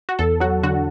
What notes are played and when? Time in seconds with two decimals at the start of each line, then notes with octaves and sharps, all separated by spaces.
0.09 F#4
0.19 E2 A4
0.40 F#3 F#4
0.63 D3 F#4